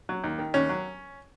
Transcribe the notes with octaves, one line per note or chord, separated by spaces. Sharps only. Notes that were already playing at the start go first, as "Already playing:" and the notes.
F#3
D#2
D#3
D#2 C#4
F#3